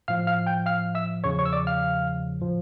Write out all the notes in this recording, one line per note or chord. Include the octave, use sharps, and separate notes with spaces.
A2 F3 F5 F6
F5 F6
G5 G6
F5 F6
E5 E6
E2 C#3 F3 C#5 C#6
C#5 C#6
E6
D5 D6
F5 F6
A2 F3